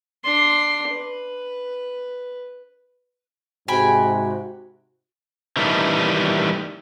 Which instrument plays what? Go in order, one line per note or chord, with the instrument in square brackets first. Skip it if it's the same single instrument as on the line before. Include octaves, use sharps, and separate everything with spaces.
[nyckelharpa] D4 C6
B4
[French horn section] G#2 C3 [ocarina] F#4 [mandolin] G5 G#5 B5
[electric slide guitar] D#3 E3 G3 A3 D#4